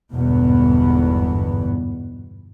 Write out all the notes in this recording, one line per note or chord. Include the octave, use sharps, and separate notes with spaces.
G1 E2 G#2 B2 B3